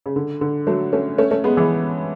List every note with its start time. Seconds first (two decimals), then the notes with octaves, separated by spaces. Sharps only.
0.06 C#3
0.16 D3
0.41 D3
0.67 F#3 A3
0.93 A3 C#4
1.18 A3 C#4
1.31 A3 C#4
1.44 G#3 B3
1.57 E3 G#3